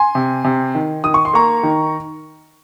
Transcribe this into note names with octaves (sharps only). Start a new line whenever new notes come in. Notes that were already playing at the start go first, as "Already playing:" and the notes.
Already playing: G#5 C6
C3
C3
D#3
D#3 D#6
C#6
C6
A#3 A#5 C#6
D#3